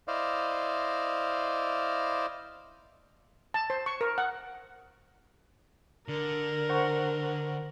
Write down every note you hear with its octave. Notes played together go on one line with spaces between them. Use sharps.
E4 C5 D5 D#5 F5
A5
C5
C#6
A#4
F#5
D3 A#4
C5 F#5 C#6